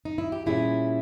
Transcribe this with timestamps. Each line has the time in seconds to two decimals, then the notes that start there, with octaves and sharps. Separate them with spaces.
0.05 D#4
0.18 E4
0.32 G4
0.46 A#2 G3 C#4 E4 G#4